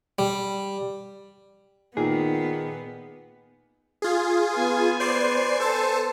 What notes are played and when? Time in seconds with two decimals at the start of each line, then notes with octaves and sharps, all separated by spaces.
0.19 G3
1.97 A#2 D#3 B3 G#4
4.02 F4 G#4
4.54 B3 G#5
5.00 C5 D5 C7
5.60 A4 C5 A5